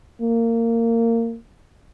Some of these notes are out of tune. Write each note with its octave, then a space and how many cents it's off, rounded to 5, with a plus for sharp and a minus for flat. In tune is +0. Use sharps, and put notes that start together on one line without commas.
A#3 -20